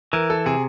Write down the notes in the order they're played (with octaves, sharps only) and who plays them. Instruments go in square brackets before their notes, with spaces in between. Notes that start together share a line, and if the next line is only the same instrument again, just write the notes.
[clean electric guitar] E3 [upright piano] A#4
[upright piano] A4
[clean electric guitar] C3 [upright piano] G#4